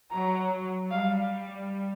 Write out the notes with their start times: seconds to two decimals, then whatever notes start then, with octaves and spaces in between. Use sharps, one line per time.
0.12 F#3 A#5
0.90 G3 F5